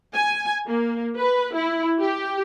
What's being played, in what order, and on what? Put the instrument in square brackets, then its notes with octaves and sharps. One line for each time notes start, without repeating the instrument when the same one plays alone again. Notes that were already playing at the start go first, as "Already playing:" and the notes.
[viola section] G#5
A#3
B4
E4
G4